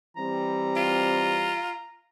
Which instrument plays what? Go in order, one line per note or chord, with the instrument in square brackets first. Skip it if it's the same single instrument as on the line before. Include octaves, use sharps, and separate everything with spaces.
[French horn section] E3 G3 C4 [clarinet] A#5
[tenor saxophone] F4